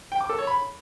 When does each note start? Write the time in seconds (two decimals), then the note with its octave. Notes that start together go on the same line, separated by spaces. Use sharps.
0.12 G5
0.21 D6
0.29 A4
0.38 C#5
0.47 B5